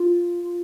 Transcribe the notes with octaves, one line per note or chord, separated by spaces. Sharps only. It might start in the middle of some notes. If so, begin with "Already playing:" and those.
Already playing: F4
F4